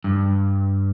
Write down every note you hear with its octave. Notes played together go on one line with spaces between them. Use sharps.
G2